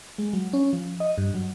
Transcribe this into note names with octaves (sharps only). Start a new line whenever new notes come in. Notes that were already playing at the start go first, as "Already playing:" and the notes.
G#3
F#3
C#4
F3
D#5
G2
F#3